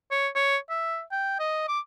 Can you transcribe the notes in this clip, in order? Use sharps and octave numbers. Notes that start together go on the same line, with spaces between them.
C#5
C#5
E5
G5
D#5
D6